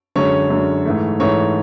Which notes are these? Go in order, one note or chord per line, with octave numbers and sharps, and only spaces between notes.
F#2 D3 G#3 C#5
F#2 D3 G#3
G#2 E3 A3
G#2 E3 A3 C#5